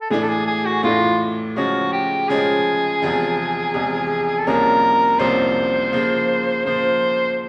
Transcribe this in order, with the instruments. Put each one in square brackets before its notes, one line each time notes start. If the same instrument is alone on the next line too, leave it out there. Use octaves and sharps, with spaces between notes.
[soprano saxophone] A4
[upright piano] A2 E3 A3 D4 [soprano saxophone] G#4
[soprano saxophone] A4
G#4
G#4
F#4
[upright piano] A2 E3 A3 D4 [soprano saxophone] F4
[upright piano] C#3 F3 G#3 C#4 [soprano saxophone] F#4
[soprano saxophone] G4
[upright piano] C#3 F3 G#3 C#4 [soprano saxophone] G#4
[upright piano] E2 C3 F3 G#3
E2 C3 F3 G#3
[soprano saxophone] A4
[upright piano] C2 C3 F3 A#3 C#4 [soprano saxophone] A#4
[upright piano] C2 C3 F3 A#3 C#4 [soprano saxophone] C5
[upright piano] C#3 F3 A#3
[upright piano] C#3 F3 A#3 [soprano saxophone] C5